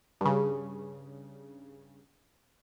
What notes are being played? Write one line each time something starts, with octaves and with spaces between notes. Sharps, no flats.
G2 C#3